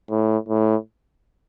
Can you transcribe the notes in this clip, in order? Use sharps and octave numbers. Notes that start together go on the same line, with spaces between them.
A2
A2